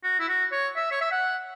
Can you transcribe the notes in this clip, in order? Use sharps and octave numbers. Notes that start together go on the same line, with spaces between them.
F#4
E4
F#4
C#5
E5
C#5
E5
F#5